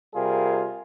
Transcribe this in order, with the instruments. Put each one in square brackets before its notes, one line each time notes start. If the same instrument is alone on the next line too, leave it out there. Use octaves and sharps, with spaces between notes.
[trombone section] C3 G3 F4 G#4 A#4